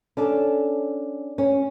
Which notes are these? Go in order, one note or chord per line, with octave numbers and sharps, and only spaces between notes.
C#4 D4 A4
C#4